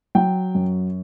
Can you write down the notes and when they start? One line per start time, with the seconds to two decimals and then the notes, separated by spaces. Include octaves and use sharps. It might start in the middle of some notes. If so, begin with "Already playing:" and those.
0.15 F#3 G5
0.55 F#2